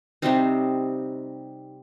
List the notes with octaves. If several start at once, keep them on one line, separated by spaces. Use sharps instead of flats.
C3 G3 C4 D#4